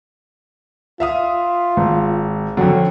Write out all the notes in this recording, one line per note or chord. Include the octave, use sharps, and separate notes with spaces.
F4 E5 F5 D#6
G#1
F2 D3 F#3